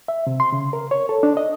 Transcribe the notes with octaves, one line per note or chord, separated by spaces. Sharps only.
E5
C3
C6
C#3
A#4
C#5
A4
D4
D#5